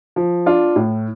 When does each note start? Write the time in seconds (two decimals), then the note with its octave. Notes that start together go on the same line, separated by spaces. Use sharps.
0.16 F3
0.46 D4 F4
0.76 A2